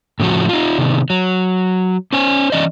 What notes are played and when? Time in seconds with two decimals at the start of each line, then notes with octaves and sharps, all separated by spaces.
0.20 A2 C#3 F3 F#4
0.49 D#4 F4
0.79 C3 D#3 B3
1.10 F#3
2.13 C#4 C5 G#5
2.52 E3 C#4 D5 D#5